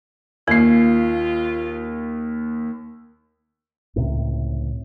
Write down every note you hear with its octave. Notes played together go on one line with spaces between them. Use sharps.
D#2 A#3 F4 C7
C#2 A2 C3